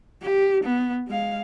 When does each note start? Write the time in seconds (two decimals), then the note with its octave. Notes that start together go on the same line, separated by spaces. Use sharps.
0.22 G4
0.64 B3
1.08 G#3 F5